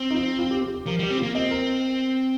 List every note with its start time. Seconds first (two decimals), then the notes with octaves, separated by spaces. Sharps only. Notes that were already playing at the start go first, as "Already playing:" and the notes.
Already playing: C4
0.11 D#4
0.15 F4
0.39 F4
0.51 G4
0.62 G4
0.74 G4
0.86 F3 A#4
0.99 G3 G4
1.10 C4
1.18 A#3 F4
1.35 C4 D#5
1.51 A#4